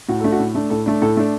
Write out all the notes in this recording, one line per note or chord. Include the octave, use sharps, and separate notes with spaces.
A2 F#4
A3 D4 A4
F#4
A2
A3 D4
A2 A4
A3 D4
A2 A4
A3 D4